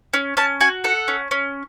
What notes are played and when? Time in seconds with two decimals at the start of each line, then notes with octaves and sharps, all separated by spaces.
0.13 C#4
0.37 C#4 A5
0.61 F#4 G#5
0.84 A4 F#5
1.08 C#4
1.31 C#4